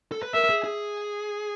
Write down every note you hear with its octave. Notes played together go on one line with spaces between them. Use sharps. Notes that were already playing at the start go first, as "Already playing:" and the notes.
A4
B4
A#4 E5
G#4
G#4